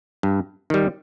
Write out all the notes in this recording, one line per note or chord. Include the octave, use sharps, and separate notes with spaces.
G2
D#3 G3